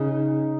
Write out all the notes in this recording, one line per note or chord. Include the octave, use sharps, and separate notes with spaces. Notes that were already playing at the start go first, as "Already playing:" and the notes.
Already playing: C#3 D#4